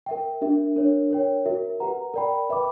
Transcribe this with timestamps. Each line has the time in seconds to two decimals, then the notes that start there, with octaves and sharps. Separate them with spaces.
0.06 A#4 E5 G5
0.41 D4 G4 A#4 E5
0.76 D4 A#4 C#5
1.10 A#4 C#5 G5
1.45 F#4 A#4 E5
1.80 G4 B4 F#5 A#5
2.14 A#4 D5 G5 B5
2.49 B4 E5 G5 B5 D6